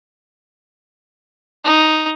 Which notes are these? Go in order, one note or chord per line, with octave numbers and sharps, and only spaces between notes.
D#4